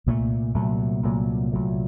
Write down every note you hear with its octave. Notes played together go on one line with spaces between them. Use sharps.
C2 A#2 F#3 A3
C2 A#2 F#3 A3
C2 A#2 F#3 A3
C2 A#2 F#3 A3